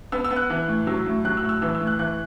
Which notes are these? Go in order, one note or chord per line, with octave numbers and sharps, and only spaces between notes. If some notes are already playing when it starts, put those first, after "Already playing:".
B3 E6
E6
B3
F#6
E3
A2
F#3 E6
A2
F#3 F#6
E6
A2
E6
E3 E6
E6
A2
F#6
E3 F#6